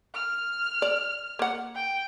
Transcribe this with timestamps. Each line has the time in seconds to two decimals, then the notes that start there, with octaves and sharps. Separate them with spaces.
0.14 F6
0.82 D5
1.39 A#3 F#5
1.75 G5